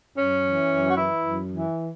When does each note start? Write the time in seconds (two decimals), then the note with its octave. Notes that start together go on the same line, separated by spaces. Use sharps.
0.15 F#2 C#4
0.42 E3
0.69 F#2
0.89 F#4
0.96 E3 E4
1.24 F#2
1.50 E3